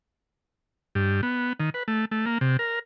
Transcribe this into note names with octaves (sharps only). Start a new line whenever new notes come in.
G2
B3
D#3
B4
A3
A3
A#3
C3
A#4